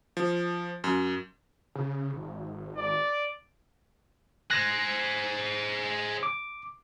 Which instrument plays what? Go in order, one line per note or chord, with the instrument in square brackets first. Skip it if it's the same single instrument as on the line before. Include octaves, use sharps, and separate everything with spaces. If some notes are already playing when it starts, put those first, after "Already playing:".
[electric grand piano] F3
F#2
[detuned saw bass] C#3
G#1
[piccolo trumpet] D5
[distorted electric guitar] G#4 C5 [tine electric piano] F#6 A#6
[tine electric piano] D6